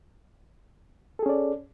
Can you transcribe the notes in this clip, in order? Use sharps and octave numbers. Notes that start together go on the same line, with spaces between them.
C#4 G#4 A4 D5